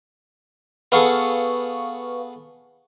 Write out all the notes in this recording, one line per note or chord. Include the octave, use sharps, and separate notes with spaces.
B3 G#4 A4 B4 F5 C#6